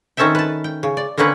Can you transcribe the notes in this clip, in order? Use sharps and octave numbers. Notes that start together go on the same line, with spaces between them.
D#3 C4 C#4 A4 E5 G5
B4 A5
G5
C#3
D5
D3 A#3 C4 C#4 B4